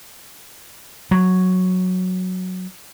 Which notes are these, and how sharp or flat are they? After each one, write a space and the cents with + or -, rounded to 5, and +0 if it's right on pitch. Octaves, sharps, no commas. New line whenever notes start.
F#3 -5